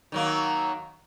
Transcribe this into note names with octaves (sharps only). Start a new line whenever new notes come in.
D#3 F#3 A#3